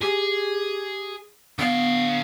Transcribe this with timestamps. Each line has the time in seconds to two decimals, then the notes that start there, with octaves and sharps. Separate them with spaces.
0.02 G4 G#4
1.59 D3 B3 F5